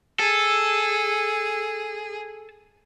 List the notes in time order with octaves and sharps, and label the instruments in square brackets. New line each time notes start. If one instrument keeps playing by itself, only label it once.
[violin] G#4 [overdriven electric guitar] A4